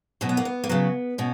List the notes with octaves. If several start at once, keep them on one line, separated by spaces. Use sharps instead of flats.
B2 F#3 C#4
B3
A#3
B3
A#3
C#3 F#3 B3
B2 C#4